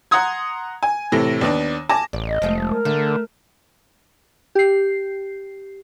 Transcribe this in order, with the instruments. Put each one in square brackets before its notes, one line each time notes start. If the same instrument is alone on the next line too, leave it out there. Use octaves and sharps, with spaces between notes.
[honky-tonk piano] F#5 A#5 C6 D#6 G#6
G#5
A2 C3 E3 A4 A#6
D#2 B3 D4
G#5 A5 D6 A#6
[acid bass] A1 [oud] D5
[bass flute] D#5
[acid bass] F1 [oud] F3 G#3 A3
[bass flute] A#4
[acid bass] D3 [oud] A3
[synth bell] G4 C7